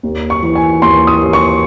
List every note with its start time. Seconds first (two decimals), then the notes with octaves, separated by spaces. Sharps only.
0.03 D#2
0.30 C#6
0.43 E3
0.55 G#5
0.82 D#2 C6
1.07 D#6
1.21 D#2
1.33 C#6